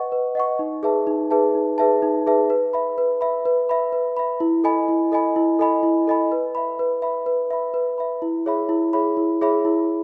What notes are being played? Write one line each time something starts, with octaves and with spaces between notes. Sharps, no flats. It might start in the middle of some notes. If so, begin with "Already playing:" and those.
Already playing: B4 D#5 F#5 C#6
B4
D#5 F#5 C#6
D#4
G#4 B4 E5 A5
D#4
G#4 B4 E5 A5
D#4
G#4 B4 E5 A5
D#4
G#4 B4 E5 A5
B4
E5 B5
B4
E5 B5
B4
E5 B5
B4
E5 B5
E4
A4 D#5 G#5 B5
E4
A4 D#5 G#5 B5
E4
A4 D#5 G#5 B5
E4
A4 D#5 G#5 B5
B4
E5 B5
B4
E5 B5
B4
E5 B5
B4
E5 B5
E4
G#4 C#5 E5 B5
E4
G#4 C#5 E5 B5
E4
G#4 C#5 E5 B5
E4